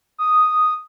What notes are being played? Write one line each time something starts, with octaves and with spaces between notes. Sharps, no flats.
D#6